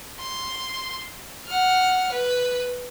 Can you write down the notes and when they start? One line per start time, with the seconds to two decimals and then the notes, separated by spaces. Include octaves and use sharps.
0.19 C6
1.48 F#5 F6
2.11 B4